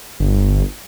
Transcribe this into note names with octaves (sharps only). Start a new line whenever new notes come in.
G1